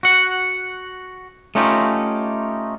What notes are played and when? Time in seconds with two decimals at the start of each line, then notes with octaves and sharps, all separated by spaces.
0.03 F#4 F#5
1.55 A3 C#4 D#4 F4 G4